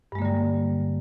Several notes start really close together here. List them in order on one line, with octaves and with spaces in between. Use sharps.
G2 G#3 A#3 D3 G3